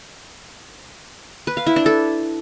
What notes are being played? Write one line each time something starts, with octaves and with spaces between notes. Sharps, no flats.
B4
F5
E4
D4
A4